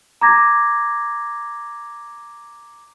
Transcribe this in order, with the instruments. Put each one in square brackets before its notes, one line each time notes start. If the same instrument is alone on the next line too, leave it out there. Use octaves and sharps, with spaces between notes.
[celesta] A#5 D6 G#6 A#6